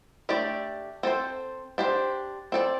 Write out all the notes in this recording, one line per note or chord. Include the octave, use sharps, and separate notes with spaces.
A3 D4 G4 D5
C4 A4 C5
D4 G4 C5
C4 A4 D5